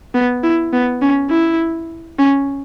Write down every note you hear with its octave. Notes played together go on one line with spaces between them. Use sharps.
B3
E4
B3
C#4
E4
C#4